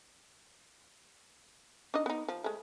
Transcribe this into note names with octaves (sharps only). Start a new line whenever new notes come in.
D4 D#4 D#5
B3 D#4
F3
G#3 A3